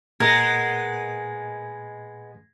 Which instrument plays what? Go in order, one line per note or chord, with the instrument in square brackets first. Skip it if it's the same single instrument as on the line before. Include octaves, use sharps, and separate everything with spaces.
[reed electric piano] A#2 [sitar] G#3 B3 [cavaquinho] A#4 [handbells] G#6 A#6 C7